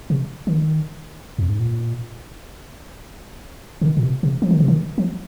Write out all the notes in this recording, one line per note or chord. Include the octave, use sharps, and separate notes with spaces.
C3
D#3
F2
G#2
A#2
C3
D#3
A#2
C3
C3
F3
D#3
C3
D#3
F3